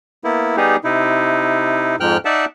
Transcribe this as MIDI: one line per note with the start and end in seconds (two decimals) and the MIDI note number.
0.24 0.56 58
0.24 0.56 59
0.24 0.56 64
0.57 0.76 55
0.57 0.76 59
0.57 0.76 63
0.57 0.76 67
0.57 0.76 68
0.84 1.96 48
0.84 1.96 63
0.84 1.96 64
2.00 2.17 41
2.00 2.17 44
2.00 2.17 53
2.00 2.17 79
2.00 2.17 89
2.00 2.17 90
2.25 2.45 63
2.25 2.45 74
2.25 2.45 76
2.25 2.45 78
2.25 2.45 81